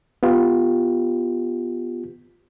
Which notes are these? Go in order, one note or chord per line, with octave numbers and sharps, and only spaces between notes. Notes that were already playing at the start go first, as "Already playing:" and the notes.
B3 F4 G4